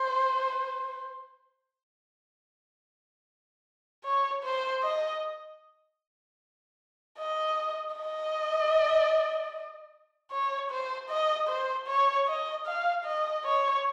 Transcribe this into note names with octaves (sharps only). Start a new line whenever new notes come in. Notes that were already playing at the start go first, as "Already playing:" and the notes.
Already playing: C5
C#5
C5
D#5
D#5
D#5
C#5
C5
D#5
C5
C#5
D#5
F5
D#5
C#5